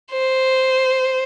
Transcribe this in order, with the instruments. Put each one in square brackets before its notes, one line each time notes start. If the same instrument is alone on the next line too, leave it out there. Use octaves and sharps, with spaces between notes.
[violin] C5